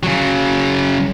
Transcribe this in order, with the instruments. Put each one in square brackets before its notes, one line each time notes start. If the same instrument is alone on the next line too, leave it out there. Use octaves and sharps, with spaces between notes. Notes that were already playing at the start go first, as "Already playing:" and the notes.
[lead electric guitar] C#3 F#3